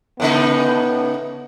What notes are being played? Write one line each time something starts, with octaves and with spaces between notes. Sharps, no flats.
A2 C#3 B3 D#4